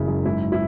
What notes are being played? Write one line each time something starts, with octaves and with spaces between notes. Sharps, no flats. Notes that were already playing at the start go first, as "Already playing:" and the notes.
Already playing: F#1 C#3 G#3 E4
F#2
G#2 E4
E4